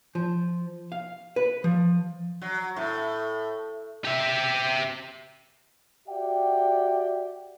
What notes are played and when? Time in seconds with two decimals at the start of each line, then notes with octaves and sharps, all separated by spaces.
0.15 F3
0.92 F5
1.36 B4
1.64 F3
2.42 F#3
2.77 A2
4.05 G4 E5
6.08 F#4 G4 D5 E5 F#5 G5